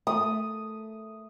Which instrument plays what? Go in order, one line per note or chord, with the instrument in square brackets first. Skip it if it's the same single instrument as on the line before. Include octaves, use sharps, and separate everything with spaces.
[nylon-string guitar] A3 [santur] D#6